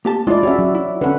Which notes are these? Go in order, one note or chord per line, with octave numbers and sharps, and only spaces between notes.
A#3 G4 A5
G#3 D4 E4 F4 D5
C#4 F#4 G#4 C#5 E5
F#3
E4
D3 C#4 B4 F#5